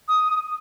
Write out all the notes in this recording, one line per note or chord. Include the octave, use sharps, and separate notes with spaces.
D#6